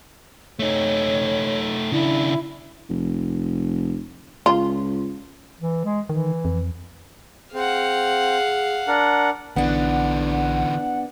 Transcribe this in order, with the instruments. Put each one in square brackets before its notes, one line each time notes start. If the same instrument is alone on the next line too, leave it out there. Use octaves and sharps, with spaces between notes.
[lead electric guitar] A3 D#4 [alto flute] C#5
[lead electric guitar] C#3 D4 [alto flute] E4
[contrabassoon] F1
[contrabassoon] C#2 [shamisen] F4
[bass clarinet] E3
G#3
[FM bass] D#3 [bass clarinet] E3
[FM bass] F2
[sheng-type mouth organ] C4 [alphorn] G#4 [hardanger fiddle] F5 F#5
[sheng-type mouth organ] D4 A#4 F#5
[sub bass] A#1 [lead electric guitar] D3 E3 [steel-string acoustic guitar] B3 D4 [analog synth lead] F#5